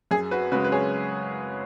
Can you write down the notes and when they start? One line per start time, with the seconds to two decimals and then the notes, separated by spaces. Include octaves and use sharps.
0.11 F#2 G#4
0.31 F#4 B4
0.52 C#3 G#3 F#4 B4
0.64 B4
0.72 G#4 C#5